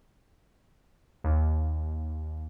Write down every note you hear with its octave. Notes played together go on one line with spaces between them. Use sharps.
D#2